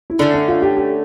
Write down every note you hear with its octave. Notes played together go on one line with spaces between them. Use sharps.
E4
D3 A3 C#4 D4
D4
F4
G4
G4